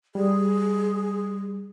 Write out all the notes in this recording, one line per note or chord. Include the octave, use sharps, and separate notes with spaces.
G3 G#4